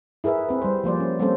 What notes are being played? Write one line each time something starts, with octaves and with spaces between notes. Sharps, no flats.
E4 G#4 A#4 B4 E5
C4 B4
G3 C5
F3 A#3 C5 D5
C#4
G3 A#3 C4 C#4 A4 C5